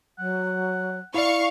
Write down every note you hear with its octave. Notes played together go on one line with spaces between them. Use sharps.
F#3 F#5
E4 D5 F5 C#6